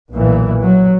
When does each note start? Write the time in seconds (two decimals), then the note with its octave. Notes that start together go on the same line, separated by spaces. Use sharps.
0.12 B1 A#2 E3
0.64 F#3